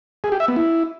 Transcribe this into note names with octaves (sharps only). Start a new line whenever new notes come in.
G#4
G4
E5
B3
E4